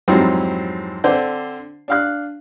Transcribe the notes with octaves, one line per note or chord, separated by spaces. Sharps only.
F2 G#2 E3 F#3 G3 C4
D3 C4 D4 C5
D4 F5 F#6